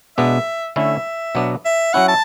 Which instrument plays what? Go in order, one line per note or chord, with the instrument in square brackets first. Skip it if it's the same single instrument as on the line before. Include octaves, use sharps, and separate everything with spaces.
[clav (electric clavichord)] B2 G#3 B3 D4 [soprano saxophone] E5
[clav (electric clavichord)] D3 A3 C#4 E4 [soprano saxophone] E5
[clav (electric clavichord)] B2 F#3 B3 D4
[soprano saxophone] E5
[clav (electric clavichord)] F#3 C#4 E4 [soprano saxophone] F#5
[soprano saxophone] A5